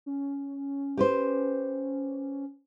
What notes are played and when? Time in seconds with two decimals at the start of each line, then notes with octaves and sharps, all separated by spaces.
0.06 C#4
0.97 G4 B4 C5